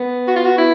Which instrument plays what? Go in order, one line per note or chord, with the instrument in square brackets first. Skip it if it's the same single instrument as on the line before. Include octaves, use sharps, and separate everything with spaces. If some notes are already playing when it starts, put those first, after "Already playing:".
Already playing: [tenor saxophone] B3
[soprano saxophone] F#4
F4
F#4
E4